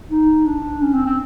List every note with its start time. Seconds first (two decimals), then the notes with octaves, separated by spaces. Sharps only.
0.10 D#4
0.46 D4
0.81 C#4
0.94 C4
1.06 C4